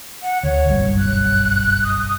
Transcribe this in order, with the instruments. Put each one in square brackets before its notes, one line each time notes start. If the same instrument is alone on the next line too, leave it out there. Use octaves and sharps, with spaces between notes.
[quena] F#5
[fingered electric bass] D2 [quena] C#5
[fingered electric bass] F#1 B1 G2
[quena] F#6
D#6